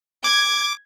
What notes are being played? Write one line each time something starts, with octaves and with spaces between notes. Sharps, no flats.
D6 G#6